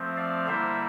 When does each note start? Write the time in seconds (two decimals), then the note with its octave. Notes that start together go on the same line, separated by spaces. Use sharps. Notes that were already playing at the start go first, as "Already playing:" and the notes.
Already playing: F3 A3 C4
0.17 D5 F5
0.47 D3 G3 A#3 E4 C5 E5